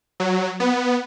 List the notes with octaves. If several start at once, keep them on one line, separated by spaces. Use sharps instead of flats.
F#3
B3